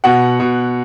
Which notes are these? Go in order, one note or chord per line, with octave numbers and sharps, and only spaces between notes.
B2 F#5
B2